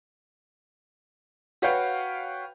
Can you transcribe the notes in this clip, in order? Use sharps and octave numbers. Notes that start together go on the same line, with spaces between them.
F#4 B4 C#5 F5 G5